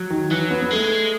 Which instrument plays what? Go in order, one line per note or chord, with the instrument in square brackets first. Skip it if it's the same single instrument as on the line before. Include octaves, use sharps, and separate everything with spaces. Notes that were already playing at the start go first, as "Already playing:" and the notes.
Already playing: [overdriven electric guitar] F#3
[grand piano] D#3
[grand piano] E3 [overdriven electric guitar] F#3
[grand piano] B3
B3
[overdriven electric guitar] G#3 [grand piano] A3